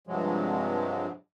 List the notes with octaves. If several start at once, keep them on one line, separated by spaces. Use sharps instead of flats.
G2 C3 F3 F#3 G#3